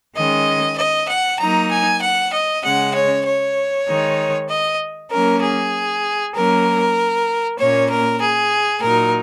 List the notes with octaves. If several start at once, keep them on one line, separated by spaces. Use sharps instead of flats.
D#3 G#3 C#4 D#5
D#5
F#5
F#3 A#3 D#4 A#5
G#5
F#5
D#5
C#3 G#3 C#4 F#5
C#5
C#5
D#3 G#3 D#4
D#5
F#3 A#3 C#4 A#4
G#4
F#3 A#3 C#4 A#4
A#2 A#3 C#4 C#5
A#4
G#4
A#2 F#3 D#4 A#4